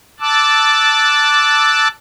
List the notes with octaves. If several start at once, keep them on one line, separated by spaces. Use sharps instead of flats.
A5 D6 E6 F#6